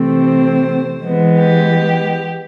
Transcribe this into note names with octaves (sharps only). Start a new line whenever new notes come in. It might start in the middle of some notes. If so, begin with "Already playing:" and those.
Already playing: C3 E3 A3 C4
C5
E3 G#3 B3
G4